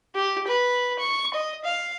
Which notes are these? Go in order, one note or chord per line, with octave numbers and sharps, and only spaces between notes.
G4
B4
C#6
D#5
F5